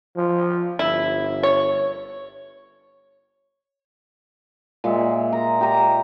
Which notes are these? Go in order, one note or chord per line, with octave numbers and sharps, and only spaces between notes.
F3
G1 E4
C#5
A#2 G#3 E5
A#5
G4 A#5